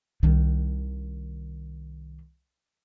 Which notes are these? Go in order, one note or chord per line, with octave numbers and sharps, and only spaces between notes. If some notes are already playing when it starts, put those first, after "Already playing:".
C2 D#3